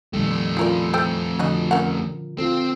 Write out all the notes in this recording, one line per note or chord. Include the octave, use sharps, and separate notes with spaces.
F2 A#2 D#3 G3 A3
C#3 E4 F4 A#4 D5
A4 C5 G5
D3 F3 D4 F#4 D#5
C#4 A#4 F#5
C4 F4 A4